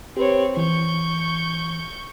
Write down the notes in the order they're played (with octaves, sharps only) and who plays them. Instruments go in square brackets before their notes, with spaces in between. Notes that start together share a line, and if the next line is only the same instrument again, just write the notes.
[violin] C4 C#5 [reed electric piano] G4 B4
[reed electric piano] E3 [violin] C#6 G6